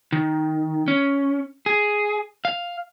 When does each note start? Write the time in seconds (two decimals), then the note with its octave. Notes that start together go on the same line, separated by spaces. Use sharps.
0.12 D#3
0.88 C#4
1.66 G#4
2.45 F5